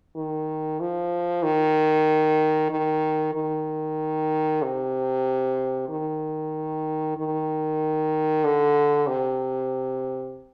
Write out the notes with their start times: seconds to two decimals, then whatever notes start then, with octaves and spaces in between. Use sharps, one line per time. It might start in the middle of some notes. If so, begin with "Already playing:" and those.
0.16 D#3
0.80 F3
1.43 D#3
2.70 D#3
3.34 D#3
4.62 C3
5.89 D#3
7.17 D#3
8.44 D3
9.07 C3